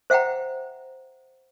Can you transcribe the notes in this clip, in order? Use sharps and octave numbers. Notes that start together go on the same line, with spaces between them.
C5 E5 F#5 G5 A#5